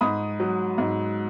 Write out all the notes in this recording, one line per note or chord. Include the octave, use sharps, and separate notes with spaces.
G#2 B5 D#6
F#3
G#2